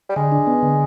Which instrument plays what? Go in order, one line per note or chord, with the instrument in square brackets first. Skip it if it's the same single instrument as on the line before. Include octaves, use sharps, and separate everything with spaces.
[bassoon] G3
[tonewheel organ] D3 [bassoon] G#3
[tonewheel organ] D4
B3
D3